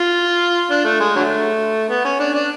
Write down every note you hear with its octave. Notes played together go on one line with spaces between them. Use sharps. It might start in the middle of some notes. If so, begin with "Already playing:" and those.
Already playing: F4
D4
A3
G#3
D3 F#3 A3
B3
C#4
D4
D4